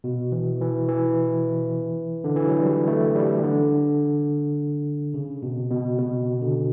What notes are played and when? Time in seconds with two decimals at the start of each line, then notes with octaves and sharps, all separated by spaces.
0.04 B2
0.32 E3
0.61 E3
0.89 E3
2.24 D3
2.36 E3
2.47 F#3
2.59 G3
2.87 A3
3.16 G3
3.44 D3
5.14 C#3
5.43 B2
5.71 B2
5.99 B2
6.42 D3